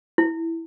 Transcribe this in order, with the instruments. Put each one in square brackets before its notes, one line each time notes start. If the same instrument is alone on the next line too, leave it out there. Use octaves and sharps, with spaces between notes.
[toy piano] E4